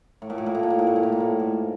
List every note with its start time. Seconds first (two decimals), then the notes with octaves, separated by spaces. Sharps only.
0.22 A2
0.30 A#2
0.38 A2
0.46 A#2
0.55 A2
0.63 A#2
0.70 A2
0.79 A#2
0.87 A2
0.96 A#2
1.03 A2
1.12 A#2
1.20 A2
1.40 G#2